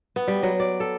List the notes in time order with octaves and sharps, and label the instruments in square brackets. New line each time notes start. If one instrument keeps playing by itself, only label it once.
[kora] B3
G3
F#3
D5
A4